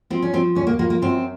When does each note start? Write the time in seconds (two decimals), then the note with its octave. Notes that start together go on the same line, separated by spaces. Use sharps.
0.10 F3 C4
0.22 C#4
0.33 F3 C4
0.55 D#2 C#4
0.67 A#3
0.79 F3 A#3
0.90 A#3
1.02 F#2 C4